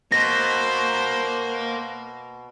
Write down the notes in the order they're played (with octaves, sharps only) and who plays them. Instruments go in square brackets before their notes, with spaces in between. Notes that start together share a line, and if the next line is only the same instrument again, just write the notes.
[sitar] B2 [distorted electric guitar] A#3 [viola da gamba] C5 [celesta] A#6